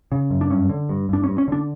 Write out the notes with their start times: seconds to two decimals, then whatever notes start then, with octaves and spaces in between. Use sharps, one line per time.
0.12 C#3
0.30 F#2
0.41 D4
0.50 G2 C#4
0.69 D3
0.89 G2
1.09 G2 D4
1.24 C#4
1.28 G2
1.38 C#4
1.48 D3 D4